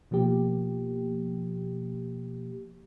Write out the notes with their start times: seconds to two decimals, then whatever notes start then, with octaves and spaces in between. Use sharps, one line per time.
0.11 B2 F3 A#3 G4